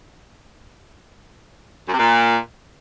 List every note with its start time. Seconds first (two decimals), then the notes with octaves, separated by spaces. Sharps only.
1.88 F#2
1.94 C3
1.99 A#2